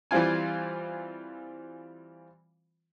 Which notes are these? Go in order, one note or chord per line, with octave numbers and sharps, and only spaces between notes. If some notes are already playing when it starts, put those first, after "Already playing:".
E3 G3 C4 F4 G#5